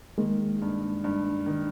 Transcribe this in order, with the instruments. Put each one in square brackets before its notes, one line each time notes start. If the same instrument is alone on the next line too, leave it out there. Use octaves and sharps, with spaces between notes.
[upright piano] D#3 [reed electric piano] G#3 A#3
[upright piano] G2
G2
D#3